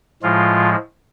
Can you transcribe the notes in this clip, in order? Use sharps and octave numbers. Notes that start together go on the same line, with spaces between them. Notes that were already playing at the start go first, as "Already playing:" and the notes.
A2 F3 G#3 F4